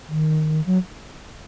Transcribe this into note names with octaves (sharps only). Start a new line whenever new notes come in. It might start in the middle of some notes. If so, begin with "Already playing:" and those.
D#3
F#3